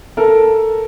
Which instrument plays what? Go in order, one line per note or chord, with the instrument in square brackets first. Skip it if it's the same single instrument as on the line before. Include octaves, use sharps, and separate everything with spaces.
[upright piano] A4 A#4